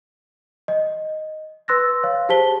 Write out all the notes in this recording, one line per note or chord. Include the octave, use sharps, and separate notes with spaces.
D#5
B4 C6 E6 F#6 A6 A#6
C#5 F5
G4 G#4 C5 A5 B6 G7